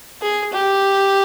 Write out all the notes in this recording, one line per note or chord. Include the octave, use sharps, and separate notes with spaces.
G#4
G4